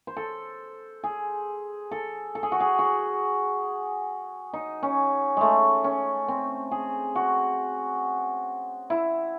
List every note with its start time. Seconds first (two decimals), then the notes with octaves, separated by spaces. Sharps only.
0.07 C5
0.17 A4
1.04 G#4
1.91 A4
2.35 A4
2.43 G#4
2.52 F#4
2.60 G#4
2.79 F#4
4.53 D#4
4.83 C#4
5.37 G#3 A3
5.84 C#4
6.28 C4
6.71 G#4
7.15 F#4
8.90 E4